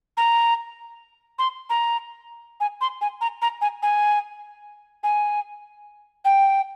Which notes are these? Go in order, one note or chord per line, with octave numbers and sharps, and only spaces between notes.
A#5
C6
A#5
G#5
C6
G#5
A#5
A#5
G#5
G#5
G#5
G5